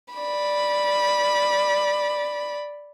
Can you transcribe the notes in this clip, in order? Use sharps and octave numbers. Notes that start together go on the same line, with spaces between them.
D5 B5